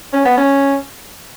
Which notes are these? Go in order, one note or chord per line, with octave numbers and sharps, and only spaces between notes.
C#4
B3
C#4